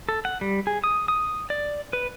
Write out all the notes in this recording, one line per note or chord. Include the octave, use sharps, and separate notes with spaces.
A4
F#5
G3
G#4
D#6
D#6
D5
B4